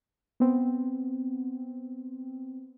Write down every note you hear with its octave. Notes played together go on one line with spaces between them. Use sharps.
B3 C4